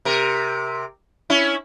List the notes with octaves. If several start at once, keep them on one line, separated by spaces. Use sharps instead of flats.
C3 A#4
C#4 E4